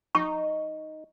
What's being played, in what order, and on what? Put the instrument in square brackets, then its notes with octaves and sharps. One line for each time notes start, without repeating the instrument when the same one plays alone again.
[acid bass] D#4 [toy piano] C#6